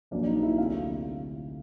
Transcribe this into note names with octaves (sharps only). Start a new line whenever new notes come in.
A#1 A#2 F#3 A#3 D4 D5
D#4 D#5
E4 E5
D2 C3 F4 F5